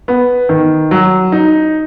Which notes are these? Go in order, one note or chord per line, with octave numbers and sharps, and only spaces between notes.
B3
D#3
F#3
D#4